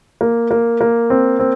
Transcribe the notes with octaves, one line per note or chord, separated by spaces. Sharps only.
A#3
A#3
A#3
C4
C4